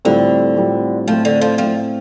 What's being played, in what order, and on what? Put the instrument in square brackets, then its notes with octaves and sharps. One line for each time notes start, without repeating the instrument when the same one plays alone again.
[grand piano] A2 G3 C4 F4 A4 [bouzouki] D3
[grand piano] A2 G3 C4 F4 A4
[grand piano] A2 A3 C4 [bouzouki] F3
[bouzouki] D3
F3
[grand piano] A2 A3 C4 [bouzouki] F3